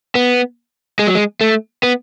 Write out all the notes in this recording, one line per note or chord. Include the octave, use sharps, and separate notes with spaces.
B3
G#3
F#3
G#3
A3
B3